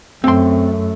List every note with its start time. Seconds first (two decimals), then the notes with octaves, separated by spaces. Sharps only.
0.24 F#2 A3 C4 C6